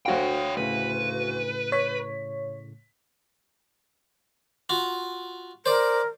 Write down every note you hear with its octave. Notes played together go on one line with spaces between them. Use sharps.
D2 F#4 C#5 F5 G5
A2 C#3 A3 B4
C#5 B6
F4 F#4
A#4 C5 D5